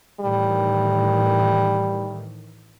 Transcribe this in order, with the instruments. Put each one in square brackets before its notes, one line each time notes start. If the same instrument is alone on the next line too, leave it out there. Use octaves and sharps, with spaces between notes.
[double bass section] A2 D#3 E3 [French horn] G3